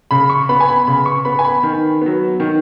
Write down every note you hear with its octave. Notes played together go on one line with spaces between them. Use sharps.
C#3 B5
C#6
B3 B5
G#5
B5
C#3 B5
C#6
B3 B5
G#5
B5
D#3
F#3 B3
D#3